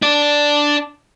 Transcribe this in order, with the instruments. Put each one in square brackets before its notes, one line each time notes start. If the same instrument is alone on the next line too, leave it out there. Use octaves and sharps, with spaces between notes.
[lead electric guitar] D4 D5